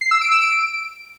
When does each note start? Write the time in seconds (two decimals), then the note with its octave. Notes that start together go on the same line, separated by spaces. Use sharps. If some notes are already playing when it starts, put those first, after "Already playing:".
0.01 C7
0.11 E6
0.21 D7
0.31 E6
0.41 D7